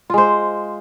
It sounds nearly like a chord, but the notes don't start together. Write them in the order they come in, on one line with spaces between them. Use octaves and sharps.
F4 G#3 C5